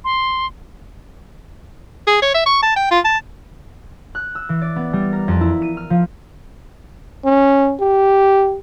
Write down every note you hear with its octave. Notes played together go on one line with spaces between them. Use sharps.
C6
G#4
C#5
E5
C#6
A5
G5
F4
A5
F#6
E6
E3
D5
B3
G3
A#4
F2
E4
D#7
F6
F3
C#4
G4